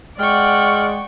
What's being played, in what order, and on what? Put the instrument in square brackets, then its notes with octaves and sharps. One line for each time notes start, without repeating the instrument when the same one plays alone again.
[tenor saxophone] G#3 [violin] D5 F#5 [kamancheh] G5 C#6 [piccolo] F6